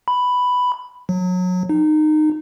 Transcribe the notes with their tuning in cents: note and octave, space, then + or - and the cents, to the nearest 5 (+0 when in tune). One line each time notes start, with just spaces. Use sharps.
B5 +5
F#3 -25
D#4 -20